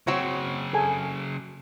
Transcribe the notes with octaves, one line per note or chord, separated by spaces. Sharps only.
C#3 F#3 C4 F#4 C#5
G#4 A4 G#5